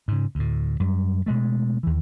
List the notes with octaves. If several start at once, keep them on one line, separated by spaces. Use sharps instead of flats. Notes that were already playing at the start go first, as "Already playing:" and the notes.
G#2 C#3
D2 A2
F#2 G3
B2 G#3 A3
D#2 E3